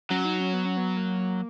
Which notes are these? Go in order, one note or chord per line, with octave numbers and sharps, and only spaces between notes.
F#3 C#4
D#4
C#4
B3
C#4
B3
A#3